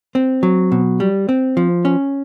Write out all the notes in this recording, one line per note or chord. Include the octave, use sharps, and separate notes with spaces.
C4
F#3
B2
G3
C4
F3
C#4